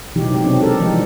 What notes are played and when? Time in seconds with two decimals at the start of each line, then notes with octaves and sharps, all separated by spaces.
0.15 B2 D#3 E3 F#3 D#4 G4
0.31 C3 D#3 F#3 G#3 G4
0.45 B2 C4 D4
0.60 G4 A4 A#4
0.79 D3 D#3 F3 G3 G#3 D#4
0.91 E3 F#3